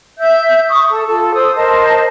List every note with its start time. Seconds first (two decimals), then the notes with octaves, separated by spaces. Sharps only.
0.18 E5 G6
0.70 C#6 D#6
0.91 A4
1.07 F4 A4
1.34 C5 D#6 E6
1.55 A#4 C5 D#5 A5